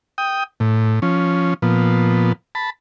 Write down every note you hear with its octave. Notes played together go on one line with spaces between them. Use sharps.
G5 D#6
A2
F3 C#4
A#2 F3 B3
A5 B5